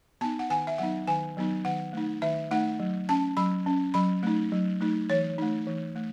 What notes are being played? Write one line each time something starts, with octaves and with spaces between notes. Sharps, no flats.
B3 D#4 A5
F#5
D#3 G#5
E5
F#3 B3 D#4 F#5
D#3 G#5
F#3 B3 D#4
D#3 F#5
A3 D#4
D#3 E5
A3 D#4 F#5
F#3
C#4 A5
F#3 B5
C#4
F#3 B5
A3 D#4
F#3
A3 D#4
E3 C#5
A3 D#4
E3
A3